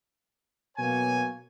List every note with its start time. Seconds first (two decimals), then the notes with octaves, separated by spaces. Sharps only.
0.78 B2 F#3 A#3 C#5 G#5